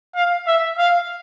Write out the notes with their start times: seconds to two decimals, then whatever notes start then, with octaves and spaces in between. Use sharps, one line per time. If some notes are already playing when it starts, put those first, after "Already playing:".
0.15 F5
0.47 E5
0.78 F5